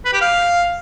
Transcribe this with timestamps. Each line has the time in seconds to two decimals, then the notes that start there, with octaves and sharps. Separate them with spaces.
0.05 B4
0.13 G4
0.21 F5